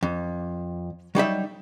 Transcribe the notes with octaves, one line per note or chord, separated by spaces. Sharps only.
F2
F#3 G3 D#4 E5